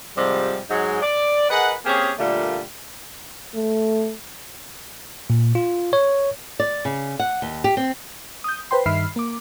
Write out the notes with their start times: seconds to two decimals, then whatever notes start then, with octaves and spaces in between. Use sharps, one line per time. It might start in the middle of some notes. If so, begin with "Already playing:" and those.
0.16 G#2 C3 F3 G3
0.70 G#2 F#3 G#3 D#4 C#5 G#5
1.02 D5
1.50 G#4 A#4 B4 D#5 F#5
1.85 A#3 C4 C#4 G4 G#4
2.19 A#2 D3 G3 A3 A#3
3.54 A3
5.30 A#2
5.55 F4
5.93 C#5
6.60 D5
6.85 C#3
7.20 F#5
7.42 D#2
7.64 G4
7.77 C4
8.44 D#6 G6
8.71 B4 C5 G5 C6
8.86 G2 D#3 E5 B5 F6 C7
9.16 A#3 D6